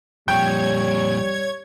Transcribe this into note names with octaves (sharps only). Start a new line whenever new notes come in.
F2 A#2 G3 C#5 G5 G#6